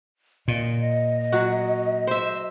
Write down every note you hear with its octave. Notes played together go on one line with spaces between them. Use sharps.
A#2 D#5
F#3 F#4
C5 E5